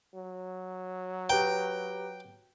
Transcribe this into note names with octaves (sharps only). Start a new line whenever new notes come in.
F#3
G4 B4 G5 A#5